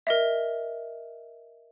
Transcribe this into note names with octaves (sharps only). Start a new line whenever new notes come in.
A#4 D#5 E5